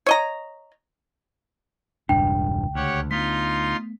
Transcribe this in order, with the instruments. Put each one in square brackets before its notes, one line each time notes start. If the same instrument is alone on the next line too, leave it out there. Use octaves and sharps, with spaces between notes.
[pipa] C#5 D#5 A#5
[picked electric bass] E1 G2 D4 [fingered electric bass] C#2 [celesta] G5
[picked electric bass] D2 [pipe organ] G4 C#5 F#5
[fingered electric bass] A3 B3 [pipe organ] D#4 F4 C6 [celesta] B6